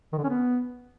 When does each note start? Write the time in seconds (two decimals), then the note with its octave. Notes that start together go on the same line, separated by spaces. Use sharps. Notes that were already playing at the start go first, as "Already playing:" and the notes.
0.13 D#3
0.18 D3
0.24 C#4
0.29 B3